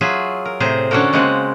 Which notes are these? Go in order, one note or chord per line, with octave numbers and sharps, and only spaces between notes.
F#3 F4 G#4 E5
A#4
A2 C3 G#4 C5 A#5
D3 C#4 D4 F#4 A4 A#4
C#3 G#3 A#3 C4 F#5